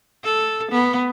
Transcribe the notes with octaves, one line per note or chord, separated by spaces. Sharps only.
A4
B3